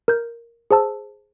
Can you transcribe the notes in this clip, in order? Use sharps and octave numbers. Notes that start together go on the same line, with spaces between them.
A#4 G6
G#4 C5 A5 E6